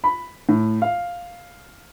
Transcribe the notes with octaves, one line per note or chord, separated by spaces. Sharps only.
B5
A2
F5